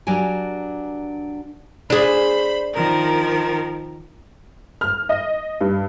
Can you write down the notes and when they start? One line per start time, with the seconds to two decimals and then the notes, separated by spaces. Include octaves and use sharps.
0.07 F#3 D4 G4 A#4 G#5
1.90 D4 G#4 C5 B5
2.73 D#3 F3 A#4
4.81 F6
5.09 D#5
5.61 G2